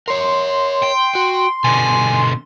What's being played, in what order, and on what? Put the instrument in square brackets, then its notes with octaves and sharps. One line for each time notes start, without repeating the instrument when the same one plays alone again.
[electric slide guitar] A#4 C#5 [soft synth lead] C6
[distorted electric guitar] G5
[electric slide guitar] F#4
[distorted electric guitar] B2 D3 [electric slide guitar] G#5